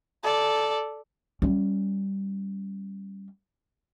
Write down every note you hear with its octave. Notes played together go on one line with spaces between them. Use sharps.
A4 D5
G3 C#4